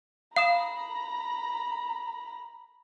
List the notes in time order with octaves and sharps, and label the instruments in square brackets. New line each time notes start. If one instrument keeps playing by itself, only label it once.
[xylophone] F5 D#6 E7 [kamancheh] A#5 B5